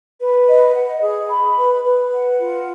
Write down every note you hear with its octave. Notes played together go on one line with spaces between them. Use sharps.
B4
D#5
F#5
G#4
B5
B4
B4
F#5
F4